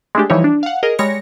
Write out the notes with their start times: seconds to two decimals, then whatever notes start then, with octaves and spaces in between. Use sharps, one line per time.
0.15 G#3 A3 D4 G4
0.30 E3 F3 G3 D#4 E4 C#5
0.44 D4
0.63 F5 F#5
0.83 G#4 A#4 D#5
0.99 G3 G#3 C#5 A#6 C#7